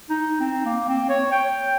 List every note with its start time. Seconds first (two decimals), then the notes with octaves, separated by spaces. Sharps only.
0.10 D#4
0.40 C4
0.65 A#3
0.88 C4
1.09 C#5
1.32 G5